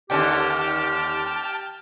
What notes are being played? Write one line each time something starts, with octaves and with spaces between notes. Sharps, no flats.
D#2 D3 C#4 G4 G5 A5 F6